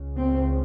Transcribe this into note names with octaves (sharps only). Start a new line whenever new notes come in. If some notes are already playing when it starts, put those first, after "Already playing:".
Already playing: C#2 C#3
C4